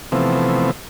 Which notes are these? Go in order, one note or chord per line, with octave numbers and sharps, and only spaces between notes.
C3 E3 F3 A3 B3 C4